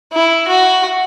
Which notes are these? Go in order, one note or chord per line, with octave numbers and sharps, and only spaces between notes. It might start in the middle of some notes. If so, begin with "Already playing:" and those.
E4
F#4